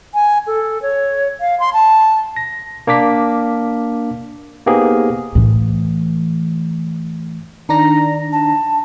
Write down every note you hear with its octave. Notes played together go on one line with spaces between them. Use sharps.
G#5
A4
C#5
F5
C6
A5
A#6
A#3 D4 D6 B6
A#3 B3 D#4 G4 G#4 C5
A2 E3
D#3 D4 A#5 A#6
A5